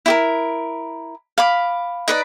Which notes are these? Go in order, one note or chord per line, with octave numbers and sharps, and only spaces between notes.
E4 G4 A#4
F5 B5 D6
D#4 B4 D5